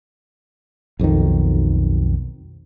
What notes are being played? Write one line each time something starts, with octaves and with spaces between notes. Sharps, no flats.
B1 F2 B2 D#3